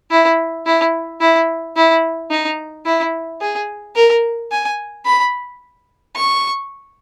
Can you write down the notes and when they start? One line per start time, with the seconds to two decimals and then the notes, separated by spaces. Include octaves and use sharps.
0.11 E4
0.66 E4
1.21 E4
1.76 E4
2.31 D#4
2.85 E4
3.41 G#4
3.95 A#4
4.52 G#5
5.05 B5
6.16 C#6